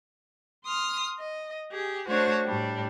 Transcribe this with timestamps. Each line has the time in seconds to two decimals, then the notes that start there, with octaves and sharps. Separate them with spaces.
0.63 C6 D#6 F6
1.19 D#5
1.71 G4 G#4
2.08 A3 D4 F#4 C5 C#5
2.45 A2 G3 D4